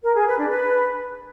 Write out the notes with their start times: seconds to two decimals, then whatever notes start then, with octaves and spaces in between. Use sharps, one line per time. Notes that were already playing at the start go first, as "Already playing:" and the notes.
0.03 A#4
0.15 G#4
0.26 B4
0.38 D4
0.49 B4